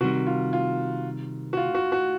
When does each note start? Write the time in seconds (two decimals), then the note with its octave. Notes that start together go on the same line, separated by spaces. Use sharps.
0.01 C3 D#3 G3 F#4
0.27 F4
0.53 F4
1.53 F#4
1.57 F4
1.74 F#4
1.92 F#4